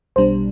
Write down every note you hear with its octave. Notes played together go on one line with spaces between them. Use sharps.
B1 B2 G3 D4 C5